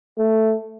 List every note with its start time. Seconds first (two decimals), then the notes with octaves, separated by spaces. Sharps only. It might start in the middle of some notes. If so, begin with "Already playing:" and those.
0.18 A3